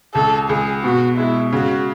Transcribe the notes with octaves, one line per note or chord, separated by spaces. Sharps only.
C#2 A4
C#2 G#4
B2 F#4
G#3 E4
C#3 F#4